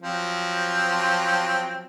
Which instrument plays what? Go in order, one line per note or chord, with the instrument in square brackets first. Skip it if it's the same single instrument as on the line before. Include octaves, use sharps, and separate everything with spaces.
[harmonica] F3 F#3 C4